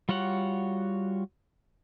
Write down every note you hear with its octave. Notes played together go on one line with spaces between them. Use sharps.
G3 F4 F#4 C#5 F#5